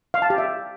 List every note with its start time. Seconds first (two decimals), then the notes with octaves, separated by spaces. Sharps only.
0.14 F5
0.22 A5
0.30 G4
0.38 E5